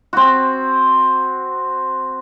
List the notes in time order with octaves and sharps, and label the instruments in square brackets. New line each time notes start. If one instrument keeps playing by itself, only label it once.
[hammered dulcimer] C4 F#4